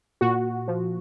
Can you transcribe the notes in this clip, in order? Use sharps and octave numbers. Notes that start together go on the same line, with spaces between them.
A#2 F#4
F3